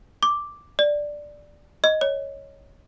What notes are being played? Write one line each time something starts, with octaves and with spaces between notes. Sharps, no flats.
D6
D5
D#5
C#5